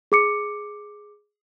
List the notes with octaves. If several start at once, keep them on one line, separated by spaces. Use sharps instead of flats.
G#4 D6 C#7